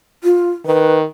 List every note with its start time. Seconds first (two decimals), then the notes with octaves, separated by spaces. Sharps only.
0.24 F4
0.66 D#3 B4